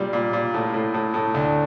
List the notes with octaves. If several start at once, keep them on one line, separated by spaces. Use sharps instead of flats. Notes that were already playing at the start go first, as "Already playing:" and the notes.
Already playing: A#2 G3
A#2
A#2
A2
A2
A2
A2
D2